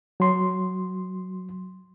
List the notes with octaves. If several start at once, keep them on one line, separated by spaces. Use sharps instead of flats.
F#3 C6